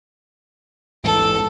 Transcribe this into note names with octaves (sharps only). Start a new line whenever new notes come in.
A1 E2 G#2 A4